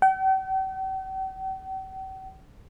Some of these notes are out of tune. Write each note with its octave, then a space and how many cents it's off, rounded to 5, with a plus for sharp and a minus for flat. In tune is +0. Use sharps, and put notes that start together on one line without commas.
G5 -45